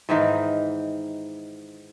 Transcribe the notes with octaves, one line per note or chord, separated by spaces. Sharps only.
G#2 D#3 E3 D#4